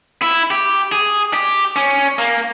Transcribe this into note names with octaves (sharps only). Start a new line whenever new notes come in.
E4
G4
G#4
G4
C#4
A#3